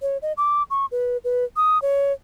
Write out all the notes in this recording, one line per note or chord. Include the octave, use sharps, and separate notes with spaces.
C#5
D#5
D6
C#6
B4
B4
D#6
C#5